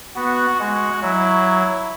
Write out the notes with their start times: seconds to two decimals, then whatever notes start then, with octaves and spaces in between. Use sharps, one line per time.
0.16 B3 F#4
0.60 G#3 F#4
1.03 F#3 E4